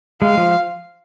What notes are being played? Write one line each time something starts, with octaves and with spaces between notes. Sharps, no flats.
G#3 F5
F3